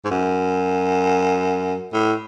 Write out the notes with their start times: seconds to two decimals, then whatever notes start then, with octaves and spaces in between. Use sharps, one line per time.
0.05 G#2
0.11 F#2
1.93 A2